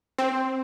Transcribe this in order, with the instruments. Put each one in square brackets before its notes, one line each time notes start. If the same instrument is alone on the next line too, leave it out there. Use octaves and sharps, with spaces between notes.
[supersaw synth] C4